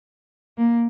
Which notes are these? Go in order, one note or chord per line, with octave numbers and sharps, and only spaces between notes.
A#3